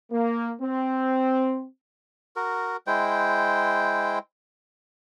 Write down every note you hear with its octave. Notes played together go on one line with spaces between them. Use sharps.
A#3
C4
F#4 A#4
G#3 E4 C5 G5